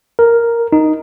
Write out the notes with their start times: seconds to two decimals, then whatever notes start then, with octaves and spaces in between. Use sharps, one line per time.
0.19 A#4
0.73 D#4